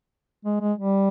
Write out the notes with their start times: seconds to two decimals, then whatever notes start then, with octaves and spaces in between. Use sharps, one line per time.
0.45 G#3
0.61 G#3
0.78 G3